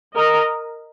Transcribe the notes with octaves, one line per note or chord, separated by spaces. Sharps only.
A#4 D#5